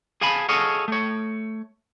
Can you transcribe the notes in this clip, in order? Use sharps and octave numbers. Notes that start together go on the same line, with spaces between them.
G#4 F5 G#5 A5 B5
G#4 A4 C#5 D#5 F5 F#5
A3 C#5